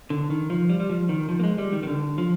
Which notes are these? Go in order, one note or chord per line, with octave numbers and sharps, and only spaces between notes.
D3
D#3
F3
G3
G3
F3
D#3
F3
A#3
G#3
G3
D#3
D#3
D3
F3